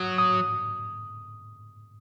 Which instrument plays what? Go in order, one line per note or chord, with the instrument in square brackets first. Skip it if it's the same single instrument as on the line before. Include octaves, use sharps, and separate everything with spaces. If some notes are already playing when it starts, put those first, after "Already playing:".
Already playing: [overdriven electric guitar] F#3 [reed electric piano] D#6
[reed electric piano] D#6